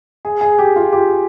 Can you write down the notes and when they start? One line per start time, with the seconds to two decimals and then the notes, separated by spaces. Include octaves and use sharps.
0.25 G#4
0.41 G#4
0.58 G4
0.76 F4
0.93 G4